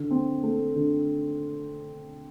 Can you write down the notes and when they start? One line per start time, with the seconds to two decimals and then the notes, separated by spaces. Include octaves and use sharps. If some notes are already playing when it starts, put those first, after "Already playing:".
Already playing: D3
0.11 C4
0.43 A3
0.76 D3